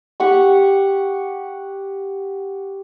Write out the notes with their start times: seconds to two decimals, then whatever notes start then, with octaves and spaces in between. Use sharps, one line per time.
0.20 G4 F#5 C#6